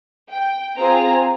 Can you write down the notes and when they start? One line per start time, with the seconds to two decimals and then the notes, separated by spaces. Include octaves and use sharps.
0.31 G5
0.76 C4 F4 G#4 A#5